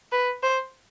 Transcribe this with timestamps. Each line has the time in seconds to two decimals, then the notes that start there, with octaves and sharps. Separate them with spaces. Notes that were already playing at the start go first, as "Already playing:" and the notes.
0.12 B4
0.43 C5